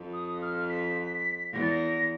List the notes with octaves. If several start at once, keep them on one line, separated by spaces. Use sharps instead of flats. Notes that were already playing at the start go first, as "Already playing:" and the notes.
Already playing: F2
D#6
F6
B6
E2 A#6
A6
A#6